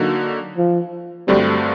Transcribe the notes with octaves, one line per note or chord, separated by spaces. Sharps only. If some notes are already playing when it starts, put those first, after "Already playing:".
Already playing: D3 F#3 A#3 D#4 F#4
F3
G2 D3 F#3 G3 A3 C4